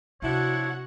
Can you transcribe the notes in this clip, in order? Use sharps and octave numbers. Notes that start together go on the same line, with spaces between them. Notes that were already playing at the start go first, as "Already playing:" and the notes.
C3 F3 D4 E4 F#4 C#5 F#5